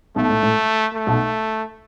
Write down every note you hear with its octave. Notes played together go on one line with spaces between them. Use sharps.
B1 B2 A3
A2
A2
A3
B1 B2